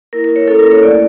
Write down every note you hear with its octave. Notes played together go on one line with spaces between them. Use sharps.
A#3 E4 A#4
A#4
C#5
A#3 C#4 E4 A4
A#4
C#5
A3 E4 D5